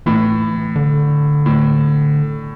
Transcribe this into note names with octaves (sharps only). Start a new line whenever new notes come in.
A2 E3
D3
A2